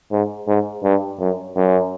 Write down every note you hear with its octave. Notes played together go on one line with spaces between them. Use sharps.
G#2
G#2
G2
F#2
F#2